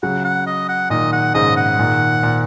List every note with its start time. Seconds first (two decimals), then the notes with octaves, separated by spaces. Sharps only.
0.03 C#3 F#3 F#5
0.24 F#5
0.47 D#5
0.69 F#5
0.90 A#2 D#3 D#5
1.12 F#5
1.35 G#2 C#3 D#5
1.57 F#5
1.78 A#2 D#3
2.23 A#2